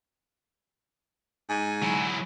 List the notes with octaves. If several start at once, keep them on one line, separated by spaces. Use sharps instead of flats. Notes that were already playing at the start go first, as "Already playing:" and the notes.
G#2 G#5
F#3 E4